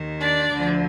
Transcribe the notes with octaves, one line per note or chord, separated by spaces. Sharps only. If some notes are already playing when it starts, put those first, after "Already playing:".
Already playing: D#2 D#3
D4 D5
D2 D3 F3